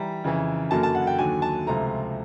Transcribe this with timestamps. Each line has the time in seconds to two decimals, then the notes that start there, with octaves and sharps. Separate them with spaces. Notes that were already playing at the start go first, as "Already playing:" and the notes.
Already playing: E3 G3 A#5
0.24 F2 C#3 E3
0.71 F#2 D3 F#3 A#3 A5
0.83 A5
0.95 F#5
1.07 G5
1.19 D#2 D3 F#3 G#5
1.42 A5
1.67 C#2 C3 F3 A3 A#5